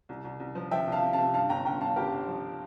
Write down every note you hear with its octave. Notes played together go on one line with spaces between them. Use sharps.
C2
C2
C2
F3
F3 E5 G5
C2 F5 A5
C3
F5 A5
C3
G2 F5 A5
G1 G5 A#5
G1 G5 A#5
G1 F5 A5
G1 G4 A#4
G1
F3